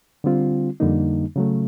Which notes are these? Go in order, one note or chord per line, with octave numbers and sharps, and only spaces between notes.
D3 G3 C4 F4
F2 D3 G3 A#3 D#4
C#3 F#3 A3